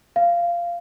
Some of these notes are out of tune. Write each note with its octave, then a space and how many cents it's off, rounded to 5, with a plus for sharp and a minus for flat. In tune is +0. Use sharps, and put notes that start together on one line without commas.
F5 -15